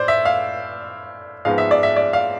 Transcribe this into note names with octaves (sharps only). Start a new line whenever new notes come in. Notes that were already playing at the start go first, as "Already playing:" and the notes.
Already playing: A2 C5 D5
E5
F5
G#2 F3 G#3 B3 F5
E5
D5
E5
D5
F5